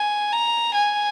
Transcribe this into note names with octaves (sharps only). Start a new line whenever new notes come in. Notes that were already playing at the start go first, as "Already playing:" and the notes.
Already playing: G#5
A#5
G#5